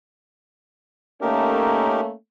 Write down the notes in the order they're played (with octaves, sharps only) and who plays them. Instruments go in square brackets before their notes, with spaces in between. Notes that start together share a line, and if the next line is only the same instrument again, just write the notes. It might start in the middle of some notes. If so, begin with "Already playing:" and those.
[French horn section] A3 A#3 C#4 [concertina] D#4 G4 A#4